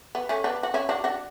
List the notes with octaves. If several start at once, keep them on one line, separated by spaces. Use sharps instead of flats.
B3
A3 C#4
B3 D4
F#4
C#4 E4
D4 F#4
D4 F#4